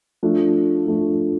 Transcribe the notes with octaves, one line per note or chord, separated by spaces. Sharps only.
F3 A3 D4
F3 A3 D4